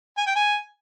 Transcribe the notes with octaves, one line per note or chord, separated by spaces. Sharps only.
G#5
G5
G#5